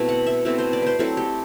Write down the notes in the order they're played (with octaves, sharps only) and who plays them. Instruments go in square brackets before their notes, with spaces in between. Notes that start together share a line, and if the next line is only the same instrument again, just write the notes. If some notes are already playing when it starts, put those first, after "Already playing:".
Already playing: [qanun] B2 A3 C4 E4
F#5
E5
B2 A3 C4 E4
C5
D5
B4 C5
F#3 A3 C4 E4 A4
G4